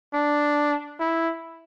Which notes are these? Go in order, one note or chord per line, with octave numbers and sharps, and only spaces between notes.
D4
E4